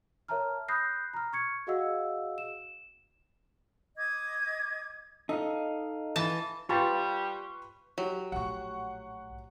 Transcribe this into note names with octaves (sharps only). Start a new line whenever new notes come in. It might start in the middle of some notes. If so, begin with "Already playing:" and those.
A#4 C#5 E5 A5 A#5 F6
B5 D#6 F#6 G6 A#6 C7
A#5 F6
C#6 G#6 C#7
F#4 G#4 D#5 F5 F#5 E6
E7
D#5 D6 G#6
D#4 A4 F5
E3 A5
G3 F4 G4 B4 A5 C6 C#6
F#3 G4
A#1 A2 F#5 C#6